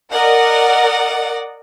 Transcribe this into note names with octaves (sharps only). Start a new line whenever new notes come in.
A#4 D5 D#5 F#5